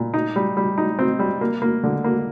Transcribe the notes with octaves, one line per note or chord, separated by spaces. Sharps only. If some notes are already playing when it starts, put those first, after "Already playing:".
Already playing: A#2
D#4
G3
G3
D#4
C4
G3
A#3
A#3
D3
A#3